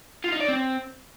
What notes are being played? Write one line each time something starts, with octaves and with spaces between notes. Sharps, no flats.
F4
D#4
D5
C4